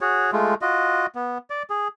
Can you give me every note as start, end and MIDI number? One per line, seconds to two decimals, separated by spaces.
0.01 0.31 66
0.01 0.31 68
0.01 0.31 73
0.33 0.55 56
0.33 0.55 57
0.33 0.55 65
0.62 1.06 65
0.62 1.06 66
0.62 1.06 75
1.15 1.38 59
1.50 1.63 74
1.70 1.88 68